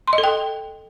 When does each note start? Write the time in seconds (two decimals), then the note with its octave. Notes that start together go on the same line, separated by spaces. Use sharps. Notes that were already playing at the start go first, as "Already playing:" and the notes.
0.08 C6
0.13 D#5
0.18 A4
0.24 G5